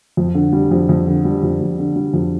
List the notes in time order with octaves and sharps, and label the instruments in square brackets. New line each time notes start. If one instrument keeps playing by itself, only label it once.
[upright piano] F2
D3
G3
F2
F2
D3
G3
F2
F2
D3
G3
F2